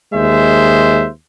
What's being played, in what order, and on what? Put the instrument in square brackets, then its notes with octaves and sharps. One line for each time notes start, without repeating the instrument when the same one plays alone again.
[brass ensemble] D#2 G#3 C5 E5